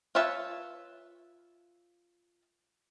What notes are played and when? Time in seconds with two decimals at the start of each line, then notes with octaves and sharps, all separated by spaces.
0.15 F4 B4 C#5 E5 A5